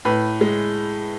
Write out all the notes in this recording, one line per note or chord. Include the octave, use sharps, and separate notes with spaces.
A2 B4
G#3